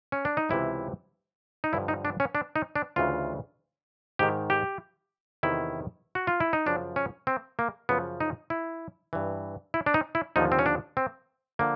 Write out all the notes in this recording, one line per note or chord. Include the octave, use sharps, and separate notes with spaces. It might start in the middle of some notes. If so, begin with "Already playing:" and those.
C#4
D4
D#4
C#2 C3 E3 E4
D#4
G2 D3 F3 E4
D#4
D4
C#4
D4
D#4
D4
D2 C#3 E3 F4
G#2 D#3 G4
G4
E2 C3 D#3 E4
F#4
F4
E4
D#4
F#2 C#3 F3 D4
C#4
C4
A#3
F#2 C#3 F3 B3
D#4
E4
G2 E3
E4
D4
D#4
E4
D#2 D3 F3 D#4
C4
C#4
D4
C4
D3 F3 A#3